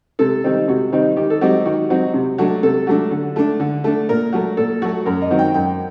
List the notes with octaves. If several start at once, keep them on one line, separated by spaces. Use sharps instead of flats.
C3 A4
D#3 G3 C4 D#4
C3 F#4
D#3 G3 C4 D#4
D#3 G4
A4
F#3 C4 D#4 G4
D#3 F#4
F#3 C4 D#4
C3
F#3 A3 D4
C3 A4
F#3 A3 D4
D3
A3 D4
D3
A3 D4
A#2 A#4
F#3 A3
A#2 A4
F#3 A3 F#4
F#2 A#4
D#5
D#3 F#3 C4
G5
F#2 G5